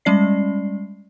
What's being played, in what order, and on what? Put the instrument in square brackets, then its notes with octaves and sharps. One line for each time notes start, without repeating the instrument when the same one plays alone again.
[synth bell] G3 G#3 C#4 D5 C7